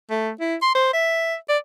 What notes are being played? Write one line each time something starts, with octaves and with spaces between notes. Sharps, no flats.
A3
E4
C6
C5
E5
D5